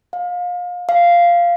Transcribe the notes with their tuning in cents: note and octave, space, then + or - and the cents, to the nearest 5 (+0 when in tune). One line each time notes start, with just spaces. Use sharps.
F5 +30
F5 -10